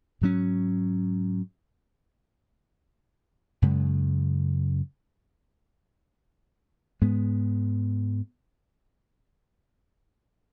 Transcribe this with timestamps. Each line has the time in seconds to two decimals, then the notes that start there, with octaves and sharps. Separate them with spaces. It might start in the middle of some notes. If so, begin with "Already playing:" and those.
0.21 G#2 F#3 C#4
3.62 F#2 C#3 G#3
7.01 G#2 G#3 B3